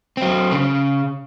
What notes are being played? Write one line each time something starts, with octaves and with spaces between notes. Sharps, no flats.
F#3 C4
C#3